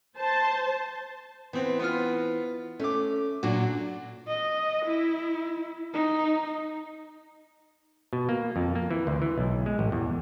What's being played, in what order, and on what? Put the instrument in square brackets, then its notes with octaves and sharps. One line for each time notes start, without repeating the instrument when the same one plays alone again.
[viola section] C5 A5
[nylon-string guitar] E3 [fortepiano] B3 C4
[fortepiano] B3 F4 F6
[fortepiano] A3 D6 [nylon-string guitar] C#4
[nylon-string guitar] A#2 F#3 [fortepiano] D4 F#4
[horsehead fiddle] D#5
E4
D#4
[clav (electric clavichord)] B2
A#3
F2
A#3
E3
D2
E3
B1
G#3
A1
E2